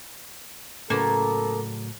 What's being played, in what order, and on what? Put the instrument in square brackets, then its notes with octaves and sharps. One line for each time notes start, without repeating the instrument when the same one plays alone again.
[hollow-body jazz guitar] A2 C#3 F#3 [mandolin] A#3 B3 [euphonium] A4